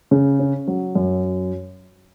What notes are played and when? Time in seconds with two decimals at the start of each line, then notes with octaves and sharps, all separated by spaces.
0.11 C#3
0.39 C#4
0.68 F#3
0.95 F#2